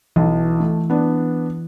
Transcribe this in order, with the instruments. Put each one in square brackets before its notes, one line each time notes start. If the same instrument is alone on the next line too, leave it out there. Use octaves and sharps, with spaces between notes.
[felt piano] B1 [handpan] E3
[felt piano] A3
B3 D4